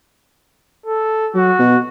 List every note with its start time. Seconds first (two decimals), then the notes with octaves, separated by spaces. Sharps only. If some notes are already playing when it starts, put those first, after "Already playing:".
0.86 A4
1.34 F#3 F#4
1.59 B2